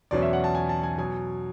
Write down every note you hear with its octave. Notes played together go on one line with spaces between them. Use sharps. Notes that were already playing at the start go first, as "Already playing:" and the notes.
E2 B2 F#3 C#4 D5
E5
F#5
A5
G#5
A5
G#5
B2 F#3 G#5